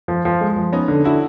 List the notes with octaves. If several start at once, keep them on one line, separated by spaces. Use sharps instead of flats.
F3
F3
G#3
F3
B3 C#4 D#4
D3
D3 E4 F#4